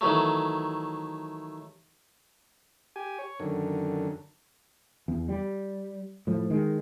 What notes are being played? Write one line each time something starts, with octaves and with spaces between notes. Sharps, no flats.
D#3 E3 F#3 A3
G4 G#5
C#5
F#2 D3 D#3
E2
G3
A2 F3
D#3 G#3